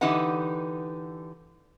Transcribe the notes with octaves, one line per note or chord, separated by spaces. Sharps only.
D3 E3 D#4 G4 B4 F#5